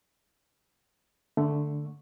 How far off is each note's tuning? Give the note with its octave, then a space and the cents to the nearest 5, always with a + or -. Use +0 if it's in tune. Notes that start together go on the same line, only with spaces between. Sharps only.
D3 +0 A3 +0